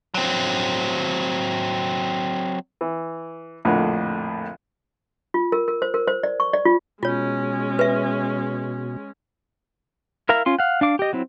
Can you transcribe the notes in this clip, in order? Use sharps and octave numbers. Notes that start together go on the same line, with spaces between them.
F#3 C4
E3
A#1 F2 A2 D3
F4
A#4
A#4
C5
A#4
C5
D5
C#6
D5
F4
B2 G#3 C#4 F4 C#5
B4 E5
E4 A#4 E5 F5 A#5
C#4 F4 C6
F5 F#5
D4 F5 D6
G4 D#5
F#3 C4 E4